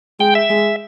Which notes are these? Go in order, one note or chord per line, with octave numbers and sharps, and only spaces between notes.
G#3 G5
E5
G#3